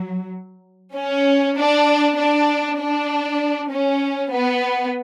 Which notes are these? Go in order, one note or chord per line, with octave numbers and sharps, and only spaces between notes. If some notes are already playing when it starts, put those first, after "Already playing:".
Already playing: F#3
C#4
D4
D4
D4
C#4
B3